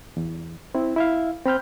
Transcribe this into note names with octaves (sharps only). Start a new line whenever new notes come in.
E2
C4 E4
E4 E5 F5
C4 B5 F6 G6